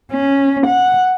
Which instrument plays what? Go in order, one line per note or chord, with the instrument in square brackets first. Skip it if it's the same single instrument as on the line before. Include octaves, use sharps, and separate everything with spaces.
[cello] C#4
F#5